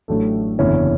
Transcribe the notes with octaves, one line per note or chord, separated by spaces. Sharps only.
A1 A2 F#3 A3 D4
F#1 E2 D3 C#4 E4